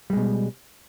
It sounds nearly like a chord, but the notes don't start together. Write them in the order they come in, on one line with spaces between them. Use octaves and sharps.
G3 G#3 B2